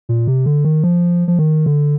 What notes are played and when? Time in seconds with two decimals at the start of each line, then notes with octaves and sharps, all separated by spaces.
0.09 A#2
0.27 C3
0.46 D3
0.64 D#3
0.84 F3
1.28 F3
1.39 D#3
1.66 D3